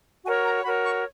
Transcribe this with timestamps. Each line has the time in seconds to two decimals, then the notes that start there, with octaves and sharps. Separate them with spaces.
0.25 F#4 A#4 C#5 G#5
0.44 A#5
0.64 F#4 A#4 C#5 B5
0.84 C#6